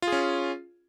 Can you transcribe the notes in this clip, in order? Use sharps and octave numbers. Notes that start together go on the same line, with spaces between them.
C#4 F4 G#4